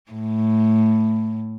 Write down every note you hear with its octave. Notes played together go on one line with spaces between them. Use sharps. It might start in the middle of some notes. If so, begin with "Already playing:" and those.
A2